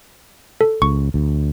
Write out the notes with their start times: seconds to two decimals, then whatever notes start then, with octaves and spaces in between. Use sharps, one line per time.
0.61 A4
0.82 C#2 C#6
1.14 D2